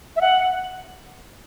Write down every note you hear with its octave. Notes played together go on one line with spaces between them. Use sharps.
E5
F#5